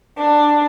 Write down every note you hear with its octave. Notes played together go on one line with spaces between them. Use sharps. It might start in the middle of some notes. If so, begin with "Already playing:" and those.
D4